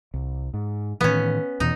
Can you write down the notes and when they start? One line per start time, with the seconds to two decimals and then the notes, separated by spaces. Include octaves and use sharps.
0.14 C2
0.54 G#2
1.01 A2 D#3 E3 B3 C#4
1.60 E2 B2 E3 D#4